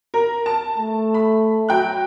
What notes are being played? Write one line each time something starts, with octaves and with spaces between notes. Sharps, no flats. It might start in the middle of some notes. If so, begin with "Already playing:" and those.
A#4
A5
A3
B5
F#3 G5 F#6